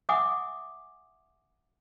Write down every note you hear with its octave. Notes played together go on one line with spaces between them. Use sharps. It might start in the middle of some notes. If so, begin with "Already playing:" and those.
E5 F#5 G#5 D6 D#6